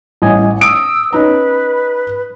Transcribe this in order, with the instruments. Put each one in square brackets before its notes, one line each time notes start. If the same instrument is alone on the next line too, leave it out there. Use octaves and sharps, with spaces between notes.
[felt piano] A1 [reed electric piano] G3 D#5 G#5
[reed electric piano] D#6 [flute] E6 [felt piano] D7
[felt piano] C#4 D#4 A#5 [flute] B4